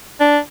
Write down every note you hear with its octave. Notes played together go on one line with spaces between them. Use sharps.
D4